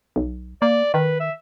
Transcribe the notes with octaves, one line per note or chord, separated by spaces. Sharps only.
B1
A#3 D5
D#3 B4
E5